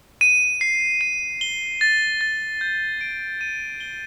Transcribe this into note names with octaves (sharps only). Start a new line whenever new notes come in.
D#7
C7
D#7
G7
A6
A6
G6
D7
D#7
G7